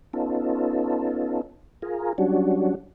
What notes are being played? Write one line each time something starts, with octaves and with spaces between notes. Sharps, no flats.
B3 C#4 D#4 F4 A4
F4 G#4 A#4
F#3 G3 C#4 D4 F#4